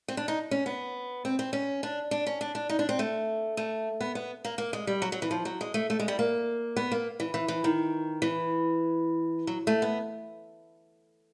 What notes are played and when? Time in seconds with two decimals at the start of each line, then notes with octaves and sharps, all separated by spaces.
0.08 C4
0.17 D4
0.28 D#4
0.51 C#4
0.66 B3
1.25 C4
1.39 C4
1.53 C#4
1.83 D4
2.11 D4
2.27 C#4
2.41 D4
2.55 D4
2.69 D#4
2.79 D4
2.89 C4
2.99 A3
3.57 A3
4.00 B3
4.15 B3
4.45 A#3
4.58 A#3
4.73 G#3
4.87 G3
5.02 F#3
5.12 F#3
5.22 E3
5.31 F3
5.45 F#3
5.61 G#3
5.74 A3
5.90 A3
5.99 G#3
6.08 G3
6.19 A#3
6.76 B3
6.91 A#3
7.20 E3
7.34 E3
7.48 E3
7.64 D#3
8.22 E3
9.47 F#3
9.67 A3
9.82 B3